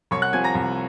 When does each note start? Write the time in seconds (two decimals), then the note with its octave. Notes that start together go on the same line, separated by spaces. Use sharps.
0.11 C2 C#5 C#6
0.22 F#5 F#6
0.33 C3 F3 G#5 G#6
0.44 A#5 A#6
0.55 C2